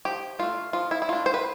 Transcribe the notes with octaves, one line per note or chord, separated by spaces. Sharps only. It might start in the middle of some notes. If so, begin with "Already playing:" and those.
F3 G4
A3 D4 F4
F3 F4
E4
E4
A3 D4 F4
C5
B4